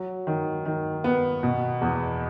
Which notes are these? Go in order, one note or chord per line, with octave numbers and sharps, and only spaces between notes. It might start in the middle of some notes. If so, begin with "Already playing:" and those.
Already playing: F#3
D#3
D#3
B3
B2
E2